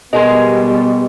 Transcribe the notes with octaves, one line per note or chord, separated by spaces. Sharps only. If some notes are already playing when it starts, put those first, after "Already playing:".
B2 G3 G#3 B3 G#4 A#4 D#5